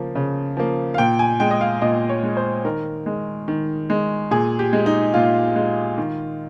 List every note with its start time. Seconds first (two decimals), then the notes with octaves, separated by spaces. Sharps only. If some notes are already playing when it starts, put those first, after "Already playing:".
Already playing: C#3 F3 A#3
0.15 C#3
0.57 F3 A#3
0.94 F5
0.98 A#2 G5
1.19 G#5
1.40 G#3 G5
1.51 D#5
1.61 F5
1.82 A#2 D#5
2.09 C#5
2.23 G#3
2.37 C5
2.65 D#3 A#4
3.06 G#3
3.48 D#3
3.90 G#3
4.31 A#2 G#4
4.59 G4
4.73 G#3
4.86 D#4
5.14 A#2 F4
5.56 G#3
5.98 D#3